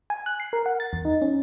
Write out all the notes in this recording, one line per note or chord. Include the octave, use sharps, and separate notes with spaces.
G#5
F#6
C7
A#4
F#5
A6
E2
D#4
C#4